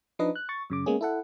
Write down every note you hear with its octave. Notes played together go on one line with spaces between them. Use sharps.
F3 D4 D#4 B4 D#5
F#6
C#6 A6
F#2 C#3 D6
G#3 A#3 B3 C#4 G#4
E4 A4 F#5